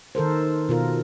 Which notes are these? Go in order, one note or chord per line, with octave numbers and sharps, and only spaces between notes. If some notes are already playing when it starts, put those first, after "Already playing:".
D#3 A4 A#4 C5
B2 F4 A#4